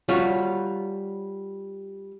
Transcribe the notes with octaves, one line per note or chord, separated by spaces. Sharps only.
G3 F4 F#4 C#5